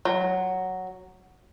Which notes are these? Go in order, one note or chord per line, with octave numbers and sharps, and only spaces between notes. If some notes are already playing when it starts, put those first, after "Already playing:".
F#3